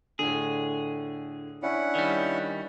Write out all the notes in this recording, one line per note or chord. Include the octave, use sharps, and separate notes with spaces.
A2 D3 G#4
C#4 D4 E4 F#5
D#3 G3